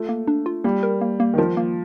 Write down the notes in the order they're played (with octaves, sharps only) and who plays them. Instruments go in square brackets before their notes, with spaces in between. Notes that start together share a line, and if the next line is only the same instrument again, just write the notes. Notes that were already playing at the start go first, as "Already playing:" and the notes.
Already playing: [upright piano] A3 [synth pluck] F4
[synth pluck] A#3
D4
F4
[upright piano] G3 [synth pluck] A#3
[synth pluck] A#4
A#3
A#3
[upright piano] D#3
[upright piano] F3 [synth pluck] A#4
[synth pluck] A#3